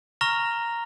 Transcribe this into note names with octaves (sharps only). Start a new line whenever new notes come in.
A#5 C#6 F6 A#6 F7